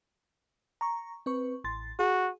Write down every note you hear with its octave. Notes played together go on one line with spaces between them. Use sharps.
A#5 C#6
C4 B4 C#6
A1 C6 A6
F#4 G#4